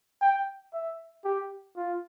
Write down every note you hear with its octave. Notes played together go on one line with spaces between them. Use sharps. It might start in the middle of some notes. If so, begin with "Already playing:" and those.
G5
E5
G4
F4